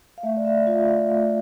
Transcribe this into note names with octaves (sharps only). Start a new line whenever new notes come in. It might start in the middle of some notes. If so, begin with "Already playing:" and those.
F5
A3 E5
D5
E5
F4 F5
F5
A3 F5